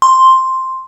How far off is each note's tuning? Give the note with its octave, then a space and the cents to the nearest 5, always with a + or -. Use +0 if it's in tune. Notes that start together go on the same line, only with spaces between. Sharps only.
C6 +5